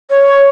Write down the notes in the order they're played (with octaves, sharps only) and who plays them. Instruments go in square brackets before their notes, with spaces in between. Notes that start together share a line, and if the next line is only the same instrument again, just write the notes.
[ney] C#5